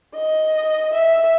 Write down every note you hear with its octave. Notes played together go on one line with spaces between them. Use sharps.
D#5
E5